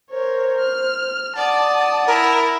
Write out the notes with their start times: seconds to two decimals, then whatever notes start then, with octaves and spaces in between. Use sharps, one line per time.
0.11 A#4 C5 C#5
0.59 F6
1.36 D5 F#5 A5 D#6
2.07 E4 A#4